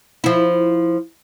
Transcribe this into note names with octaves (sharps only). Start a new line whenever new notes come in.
F3 E4